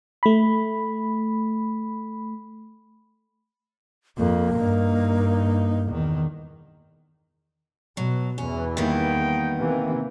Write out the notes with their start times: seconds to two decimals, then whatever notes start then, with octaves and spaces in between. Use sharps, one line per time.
0.23 A3 B5
4.17 F2 A#3
4.55 G2 D#4
5.89 E2 D#3
7.97 B2 F#3
8.38 E2 E3 C#4
8.77 D#3 G3 A#3 B3 D#4 G5
9.58 C3 E3 A#3